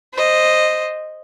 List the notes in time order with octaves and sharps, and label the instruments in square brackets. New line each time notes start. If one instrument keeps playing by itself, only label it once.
[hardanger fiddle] C5 D#5